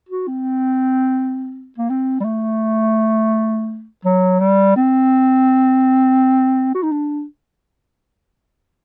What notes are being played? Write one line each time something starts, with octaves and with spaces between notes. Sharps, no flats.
F#4
C4
A#3
C4
G3
A3
F#3
G3
C4
F#4
D#4
D4